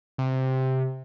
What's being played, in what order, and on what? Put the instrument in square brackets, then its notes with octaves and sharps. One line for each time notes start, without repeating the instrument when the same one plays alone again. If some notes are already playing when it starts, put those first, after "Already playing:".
[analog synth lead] C3